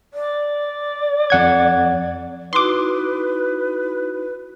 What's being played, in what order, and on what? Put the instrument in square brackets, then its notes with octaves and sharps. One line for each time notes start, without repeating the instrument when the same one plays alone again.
[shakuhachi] D5
[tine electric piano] F2 F#5 G#6
[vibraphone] D#4 E4 F#4 [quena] B4 [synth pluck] C6 D6